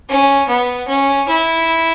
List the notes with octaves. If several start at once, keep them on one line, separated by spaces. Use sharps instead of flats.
C#4
B3
C#4
E4